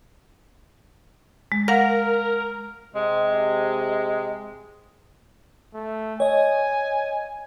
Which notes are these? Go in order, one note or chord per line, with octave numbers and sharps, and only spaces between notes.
G#3
A#4 F5 F#5 A#6
C3 G#3
A3
C#5 D#5 G#5